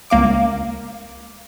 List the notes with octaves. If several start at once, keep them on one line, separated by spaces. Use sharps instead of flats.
C#2 A#3 F5 D6